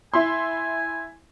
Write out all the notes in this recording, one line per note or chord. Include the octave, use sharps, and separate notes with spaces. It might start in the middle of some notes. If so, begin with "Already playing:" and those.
E4 G#5 C6